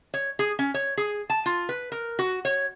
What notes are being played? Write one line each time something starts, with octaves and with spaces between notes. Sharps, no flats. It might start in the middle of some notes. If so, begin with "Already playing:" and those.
C#5
G#4
C#4
C#5
G#4
A5
F4
B4
A#4
F#4
C#5